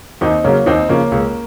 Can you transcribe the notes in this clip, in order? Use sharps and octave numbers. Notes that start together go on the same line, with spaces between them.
D#2 C4 D#4
C#3 F#3 A#3 C#4
D#2 C4 D#4
C#3 F3 A#3 C#4
C#2